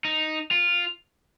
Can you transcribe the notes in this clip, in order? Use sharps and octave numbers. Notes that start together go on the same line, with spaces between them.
D#4
F4